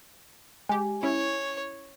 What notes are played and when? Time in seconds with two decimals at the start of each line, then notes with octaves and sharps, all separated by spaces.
0.69 G#3 G4 G#5
1.03 C#4 E4 C#5